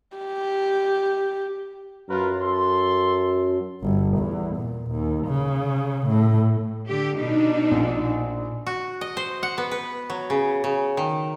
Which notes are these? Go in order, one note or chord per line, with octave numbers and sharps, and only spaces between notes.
G4
F#2 F4 A#4 B4
A4 C6
G1
E2
A#2
D#2
C#3
A2
D3 G4
B2 D4 D#4
A#1
F#4
D#5
C5
F#5
B3
B4
F#3
C#3
C#3
D#3